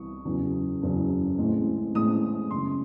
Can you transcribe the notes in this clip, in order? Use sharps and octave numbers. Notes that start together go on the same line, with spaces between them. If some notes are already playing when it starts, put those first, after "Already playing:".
Already playing: C2 C3 E3 C4 C#6 D#6
F#1 E2 C#3 F#3
F#1 E2 C#3 F#3
A1 A2 G#3 C4
A1 A2 G#3 C4 D#6
F#2 C#3 E3 C6